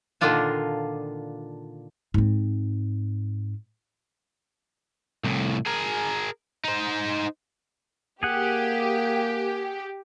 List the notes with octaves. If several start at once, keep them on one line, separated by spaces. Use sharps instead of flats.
A#2 D3 D#3 D4 F4 A5
G#2 C4
C2 A2
G#4 A#4
D#4 C5
A#3 G4 G#4 F#5